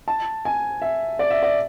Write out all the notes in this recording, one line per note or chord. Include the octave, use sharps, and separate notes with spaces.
A5
G#5
E5
D5
E5
D5